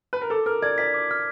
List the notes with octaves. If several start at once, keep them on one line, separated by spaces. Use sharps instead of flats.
B4
A#4
A4 D6
A#4 F6
D5 G#6
D5 B6
D6
F6